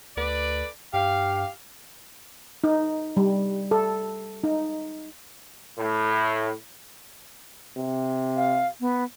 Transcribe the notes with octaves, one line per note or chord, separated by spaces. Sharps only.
D2 A4 B4 D5
G2 G4 F5
D#4
G3
A4
D#4
A2
C3
F5
B3